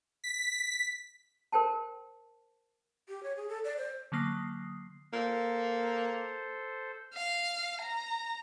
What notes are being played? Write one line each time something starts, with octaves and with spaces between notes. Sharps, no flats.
B6
A#4 C5 G5 A5
G4
C#5
G#4
A4
D5
C5
D3 F#3 A#3 D#6 C7
A#3 A4 C5
F5
A#5